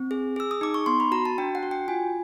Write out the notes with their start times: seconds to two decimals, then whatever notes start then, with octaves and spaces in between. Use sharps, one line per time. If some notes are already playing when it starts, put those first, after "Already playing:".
Already playing: C4
0.11 G#4
0.36 G#4 E6
0.51 D#6
0.61 D#4 D6
0.74 C#6
0.86 B3 C6
1.00 B5
1.12 F#4 A#5
1.25 A5
1.38 D4 G5
1.55 F#5
1.63 F#4
1.71 G5
1.88 F4 G#5